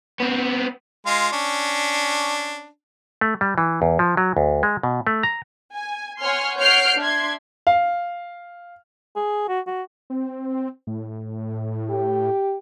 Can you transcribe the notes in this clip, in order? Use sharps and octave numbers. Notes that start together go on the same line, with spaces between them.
B3 C4
G#3 F4 F5
C#4 D4
A3
G3
E3
E2
F3
F#3
D2
G#3
B2
A3
A#5
G#5
C#5 F#5 G#5 C6 F6
C#5 F#5 F6 G6 C7 D7
D4 E5 C6 G#6
F5
G#4
F#4
F#4
C4
A2
G4